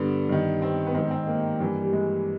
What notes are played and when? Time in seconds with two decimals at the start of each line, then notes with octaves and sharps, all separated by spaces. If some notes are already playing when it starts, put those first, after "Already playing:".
Already playing: G2 D3 B3
0.29 G2 D#3
0.62 C4
0.87 B3
0.94 G#2 D#3 C4
1.11 C4
1.27 A#3
1.60 G2 E3
1.81 G3
1.93 G#3